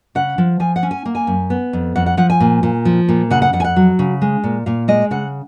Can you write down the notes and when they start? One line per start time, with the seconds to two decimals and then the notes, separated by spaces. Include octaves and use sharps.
0.15 C#3 F#5
0.38 F3
0.60 F3 G#5
0.76 F#5
0.83 C#4
0.91 G#5
1.05 A#3
1.15 G#5
1.27 F#2
1.50 B3
1.73 F2
1.96 F2 F#5
2.06 F#5
2.17 F3 F#5
2.30 G#5
2.40 A#2
2.63 A#2
2.85 F3
3.09 A#2
3.31 C#3 F#5
3.42 F#5
3.53 F2 F#5
3.60 G#5
3.64 F#5
3.76 F#3
3.99 C#3
4.22 G#3
4.44 A#2
4.66 A#2 F5
4.88 G#3 D#5
5.11 C#3 F#5